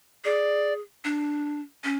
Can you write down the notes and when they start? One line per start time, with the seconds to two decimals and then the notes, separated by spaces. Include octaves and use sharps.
0.25 G#4 D5
1.05 D4
1.84 C#4